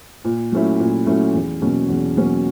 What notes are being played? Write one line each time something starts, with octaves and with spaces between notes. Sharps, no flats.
A#2
F#3 A3 C#4 E4
A#2
F#3 A3 C#4 E4
E2
B2 F#3 A#3 C#4
E2
B2 F#3 A#3 C#4